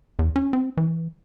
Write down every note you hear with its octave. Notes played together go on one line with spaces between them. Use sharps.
E2
C#4
C4
E3